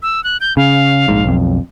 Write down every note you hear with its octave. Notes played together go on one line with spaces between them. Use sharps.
E6
F#6
G6
C#3 F5
A#1 G#2
B1 F2